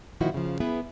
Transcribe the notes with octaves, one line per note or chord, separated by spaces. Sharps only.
A#2 D#3 F3 D#4 E4 F#4
C#3 F3
B3 E4 G#4 B4